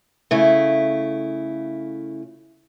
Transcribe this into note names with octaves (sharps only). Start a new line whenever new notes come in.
C#3 A3 E4